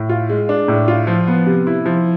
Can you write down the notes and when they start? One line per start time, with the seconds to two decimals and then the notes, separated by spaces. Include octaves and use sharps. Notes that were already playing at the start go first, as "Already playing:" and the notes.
Already playing: A2
0.09 F4
0.29 G#3
0.49 D4
0.68 A2
0.88 F4
1.07 F3
1.28 B3
1.46 C3
1.67 E4
1.86 F3